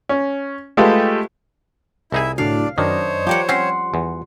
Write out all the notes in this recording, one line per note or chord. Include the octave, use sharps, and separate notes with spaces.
C#4
G#3 A3 F4 G4 A4 B4
C2 D#4 E4 G#4 E5
A2 D3 F#3 D4 D5 F5
F#2 D#3 D4 C5 C#5 D#5
F3 G3 G4 A#4 F#5
C4 C#4 F#5 C6
E2